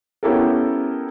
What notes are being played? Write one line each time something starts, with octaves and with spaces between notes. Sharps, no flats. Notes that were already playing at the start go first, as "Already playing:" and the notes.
B3 C#4 E4 G4 A4 A#4